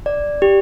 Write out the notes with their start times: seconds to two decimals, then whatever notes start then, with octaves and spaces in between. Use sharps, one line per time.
0.06 D5
0.42 G4